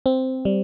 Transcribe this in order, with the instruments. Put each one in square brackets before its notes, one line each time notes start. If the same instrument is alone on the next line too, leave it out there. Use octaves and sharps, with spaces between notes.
[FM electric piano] C4
G3